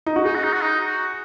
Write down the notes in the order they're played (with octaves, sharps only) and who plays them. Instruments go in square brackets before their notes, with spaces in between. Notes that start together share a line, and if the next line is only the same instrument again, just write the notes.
[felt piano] D#4
F#4
[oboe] D#4 [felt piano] G#4
[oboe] F#4
D#4
F#4
D#4
F#4